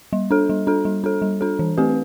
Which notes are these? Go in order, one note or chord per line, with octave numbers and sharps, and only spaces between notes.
G3
D4 A4
G3
D4 A4
G3
D4 A4
G3
D4 A4
E3
A3 C4 G4 B4